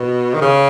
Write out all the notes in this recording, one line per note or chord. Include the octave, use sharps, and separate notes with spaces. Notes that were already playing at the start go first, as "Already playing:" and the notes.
Already playing: B2
D#3
C#3